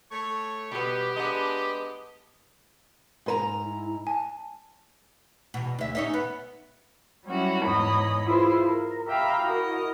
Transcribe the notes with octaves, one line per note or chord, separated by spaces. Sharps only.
A3 A4 C#5
B2 G3 B3 G4
G#3 B3 D4 D#5
G#2 B4 A#5
E4
G#5 A5
E2 B2
D2 E5
C#4 D#4 E5
B3
F#3 G3 C#4 E4 F#4
E2 G#2 C#5 D#5 B5
E4 F4 G#4 B4 C5
A#4
G4 E5 F5 G5 A#5 B5
E4 F#4 A#4 D#5